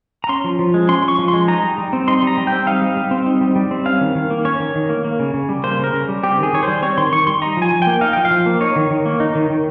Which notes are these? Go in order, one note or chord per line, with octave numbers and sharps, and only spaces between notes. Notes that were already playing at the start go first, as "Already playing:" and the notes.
A#5
C#4 C6
F3
F3
G#3
C#4 C6
F3 C#6
F3
C6
G#3
D#4 A#5
G3
G3
C4
D#4 C6
G3 A#5
G3
G5
C4
D#4 F5
G3
G3
C4
D#4
G3
G3
C4
C#4 F5
D#3
D#3
A#3
C#4 C#5
D#3
D#3
A#3
A#3
C#3
C#3
G3
A#3 C5
C#3
A#4
C#3
G3
C4 G4
D#3 G#4
D#3 C#5
G3 C5
C4 C#5
D#3 C6
D#3 C#6
G3 C6
D#4 A#5
F3 G#5
F3
G5
A#3
D#4 F5
F3 G5
F5
F3
A#3
D#4 C#5
D#3
D#3
A#3
D#4
D#3
D#3